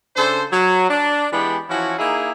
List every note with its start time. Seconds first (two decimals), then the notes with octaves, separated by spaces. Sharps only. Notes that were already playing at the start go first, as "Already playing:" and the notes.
0.16 C#3 D4 A4 C5
0.51 F#3
0.90 D4
1.32 E3 G#3 B3 D4 G4
1.69 E3 F3 C#4 E4 F#4
1.99 A#3 D#4 E4 G#4